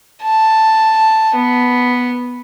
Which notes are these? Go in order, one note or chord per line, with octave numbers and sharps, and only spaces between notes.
A5
B3